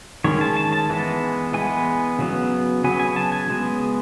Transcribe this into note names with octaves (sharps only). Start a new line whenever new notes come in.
D#3 G#3 C#4 C#5
A5
A5
A5
E3 G#3 B3
E3 G#3 B3 G#5
C#3 F#3 B3
C#3 F#3 B3 G#5
G#5
A5
G#5
C#3 G#3 B3